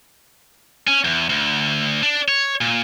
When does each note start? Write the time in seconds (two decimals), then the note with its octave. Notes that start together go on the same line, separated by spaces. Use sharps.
0.87 C#4
1.05 E2
1.29 D2
2.03 D4
2.28 C#5
2.61 A#2